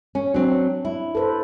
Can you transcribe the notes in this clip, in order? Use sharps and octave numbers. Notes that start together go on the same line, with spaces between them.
C#4
F#3 C4 D4
E4
A4 B4 C5